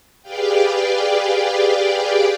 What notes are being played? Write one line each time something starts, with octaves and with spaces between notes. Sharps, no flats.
G4 G#4 B4 D5 F5 G5